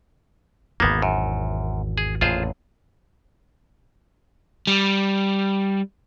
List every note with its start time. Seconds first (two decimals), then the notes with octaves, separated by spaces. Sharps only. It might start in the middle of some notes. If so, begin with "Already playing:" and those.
0.80 G#1 E2 A#3 B3
1.02 F#2
1.98 G#4
2.21 A1 F2 A#2 F4 G#4 C5
4.67 G3